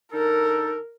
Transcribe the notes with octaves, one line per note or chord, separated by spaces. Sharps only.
D3 D#4 A4 A#4